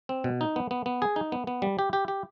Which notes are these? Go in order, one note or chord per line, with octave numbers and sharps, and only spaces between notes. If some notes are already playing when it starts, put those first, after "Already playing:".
C4
B2
D#4
B3
B3
B3
G#4
D#4
B3
B3
G3
G4
G4
G4